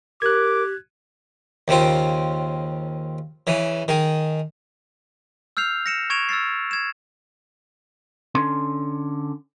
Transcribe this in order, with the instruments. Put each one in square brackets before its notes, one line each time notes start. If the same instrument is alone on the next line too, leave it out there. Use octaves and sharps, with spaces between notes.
[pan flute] G4 [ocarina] A#4 [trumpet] D6 [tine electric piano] F#6 G#6
[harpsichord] D#2 C#3 C4 F4
C#3 E3
D#3 G#4
[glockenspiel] E6 F6 G6 C7 F7
A#6 C#7 E7
C#6 G#6 D7 E7 F7
E6 F6 A6 C7
G#6 E7
[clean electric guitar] D3 C#4 C6